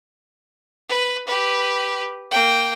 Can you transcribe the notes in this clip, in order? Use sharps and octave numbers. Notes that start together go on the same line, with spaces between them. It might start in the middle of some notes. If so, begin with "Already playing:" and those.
B4
G4 B4
A#3 G5